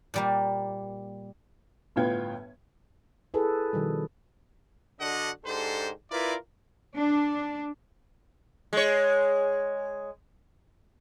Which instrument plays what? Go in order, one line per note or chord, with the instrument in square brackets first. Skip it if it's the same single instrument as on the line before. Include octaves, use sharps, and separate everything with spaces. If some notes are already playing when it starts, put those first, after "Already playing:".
[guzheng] A#2 G3 A#3
[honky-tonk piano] G1 A2 B3 F4 G5 G#6
[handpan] E4 G#4 A4 B4
B2 D#3 F3 G3
[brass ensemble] D3 D4 F#4 A4 D#5 F#5
G#2 D4 G4 A4 C5
E4 F4 A#4 B4 D5
[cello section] D4
[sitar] G#3 C#5